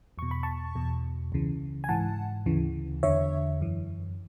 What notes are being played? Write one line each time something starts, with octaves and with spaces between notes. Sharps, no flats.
E2 B2 C#6
B5
A5 C#6
E2 B2
C#2 C#3 E3
G#5
G#2 E3 F#5 A5
D2 C#3 E3
E2 D3 C#5 E5
F#2 E3